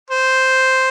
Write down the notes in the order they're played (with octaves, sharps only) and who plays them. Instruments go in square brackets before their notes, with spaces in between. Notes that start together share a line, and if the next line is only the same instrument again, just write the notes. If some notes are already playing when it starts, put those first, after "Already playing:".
[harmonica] C5